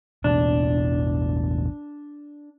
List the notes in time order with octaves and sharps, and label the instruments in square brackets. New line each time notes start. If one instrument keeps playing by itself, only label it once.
[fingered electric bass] A1 E2 B2 [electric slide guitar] D4